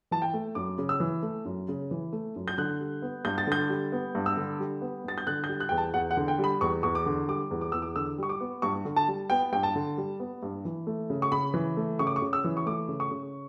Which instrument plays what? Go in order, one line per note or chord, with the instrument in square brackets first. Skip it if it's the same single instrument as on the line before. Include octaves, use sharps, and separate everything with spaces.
[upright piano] E3 A5
G5
A3
F#2 D6
C#3
E6
E3
A3
F#2
C#3
E3
A3
F#2
G6
D3 F#6
G3
B3
G2 G6
A6
D3 G6
G3
B3
G2
E6
D3
G3
B3
G2 A6
G6
D3 F#6
G6
G3
F#6
E2 G5
A5
E2 F#5
F#5
D3
G5
G3
B5
E2 C#6
E2 C#6
D6
D3
G3 D6
E2
D6
E2 E6
D6
D3 E6
G3 C#6
D6
B3
G2 C#6
D3
A5
G3
B3 G5
G2 G5
A5
D3
G3
B3
G2
E3
A3
C#3
C#6
C#3 B5
E3
A3
C#3 C#6
D6
C#6
C#3
E6
E3
C#6
A3 D6
C#3
C#6
C#3